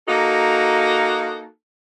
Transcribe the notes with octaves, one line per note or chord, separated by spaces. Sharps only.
A#3 D#4 F#4 A4